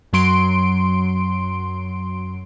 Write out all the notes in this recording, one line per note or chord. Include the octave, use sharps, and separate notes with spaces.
F#2 F#3 C6 D7